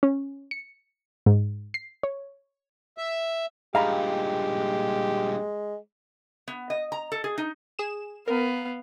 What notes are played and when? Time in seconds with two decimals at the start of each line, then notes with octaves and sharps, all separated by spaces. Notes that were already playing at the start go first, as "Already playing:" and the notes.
0.03 C#4
0.51 C#7
1.26 G#2
1.74 C7
2.03 C#5
2.98 E5
3.75 G2 A#2 G#3 G4 F5 A#5 B5
6.48 B3
6.70 D#5
6.92 A#5
7.12 A4
7.24 G#4
7.38 D#4
7.79 G#4 E7
8.28 B3 A#4 F5